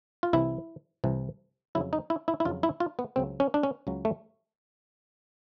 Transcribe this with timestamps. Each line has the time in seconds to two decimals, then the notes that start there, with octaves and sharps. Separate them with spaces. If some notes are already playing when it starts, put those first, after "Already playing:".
0.23 F4
0.33 C2 C3 E3 E4
1.04 C2 C3 E3
1.75 F2 C#3 F#3 E4
1.93 D#4
2.10 E4
2.28 E4
2.40 E4
2.45 F2 C#3 F#3 F4
2.63 E4
2.80 F4
2.99 B3
3.16 C#2 C#3 F#3 C4
3.40 C#4
3.54 D4
3.63 C#4
3.87 C#2 C#3 F#3
4.05 A3